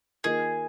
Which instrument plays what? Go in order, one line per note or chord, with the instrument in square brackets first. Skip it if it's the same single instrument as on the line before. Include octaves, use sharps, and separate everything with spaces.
[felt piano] D#3 A#3 F4 A#4 D#5 [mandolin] G#4